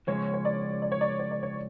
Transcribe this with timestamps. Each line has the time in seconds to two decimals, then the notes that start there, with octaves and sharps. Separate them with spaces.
0.07 C#3 F3 G#3 C#5
0.34 C#5
0.45 D5
0.82 D5
0.92 C#5
1.01 D5
1.20 C#5
1.31 D5
1.43 C#5